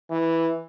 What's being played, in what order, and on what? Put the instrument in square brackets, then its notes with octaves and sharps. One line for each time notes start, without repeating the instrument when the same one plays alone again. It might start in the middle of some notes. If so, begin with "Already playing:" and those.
[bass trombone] E3